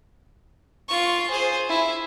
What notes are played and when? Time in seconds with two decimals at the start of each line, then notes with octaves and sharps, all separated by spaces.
0.89 F4 C#6
1.30 G#4 C5
1.69 E4